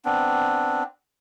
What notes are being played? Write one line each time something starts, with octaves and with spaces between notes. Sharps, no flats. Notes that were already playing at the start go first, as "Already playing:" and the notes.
B3 C4 D4